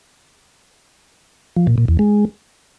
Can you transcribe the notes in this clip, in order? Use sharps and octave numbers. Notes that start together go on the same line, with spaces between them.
F3
A#2
A#2
E2
G#3